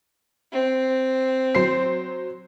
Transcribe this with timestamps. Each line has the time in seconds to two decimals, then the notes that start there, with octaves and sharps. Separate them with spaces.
0.52 C4
1.55 F#3 C5 C7